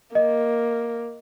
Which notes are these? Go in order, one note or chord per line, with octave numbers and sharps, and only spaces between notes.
A#3 D#5